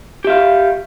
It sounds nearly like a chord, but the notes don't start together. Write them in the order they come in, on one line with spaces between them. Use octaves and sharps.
G4 E5 F5